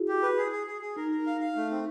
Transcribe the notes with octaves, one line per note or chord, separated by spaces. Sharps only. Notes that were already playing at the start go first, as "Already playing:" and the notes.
Already playing: E4 F#4 G#4
G4
B4
G#4
G#4
G#4
G#4
D#4 A#4
A#4
F5
F5
A3
C4